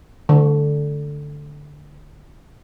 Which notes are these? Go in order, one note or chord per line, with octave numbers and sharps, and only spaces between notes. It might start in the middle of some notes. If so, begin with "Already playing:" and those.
D3